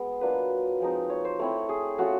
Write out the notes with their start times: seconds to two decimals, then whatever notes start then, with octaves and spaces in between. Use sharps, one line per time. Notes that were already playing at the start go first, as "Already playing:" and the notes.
Already playing: G#3 B3
0.21 F#3 A#3 D4 F4 B4
0.80 F3 G#3 C4 D#4
1.10 C#5
1.25 C5
1.39 A3 C4 E4 C#5
1.69 G#4
1.98 A3 C#4 F4 F#4